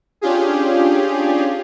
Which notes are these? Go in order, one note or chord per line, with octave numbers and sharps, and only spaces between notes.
C#4 D4 F4 G4 G#4